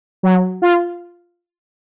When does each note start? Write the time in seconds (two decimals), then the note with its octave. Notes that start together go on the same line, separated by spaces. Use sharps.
0.23 F#3
0.62 F4